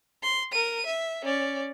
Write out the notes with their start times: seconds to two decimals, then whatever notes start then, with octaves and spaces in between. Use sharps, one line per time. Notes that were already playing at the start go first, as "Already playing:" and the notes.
0.23 C6
0.52 A#4 D#7
0.86 E5
1.25 C#4 D5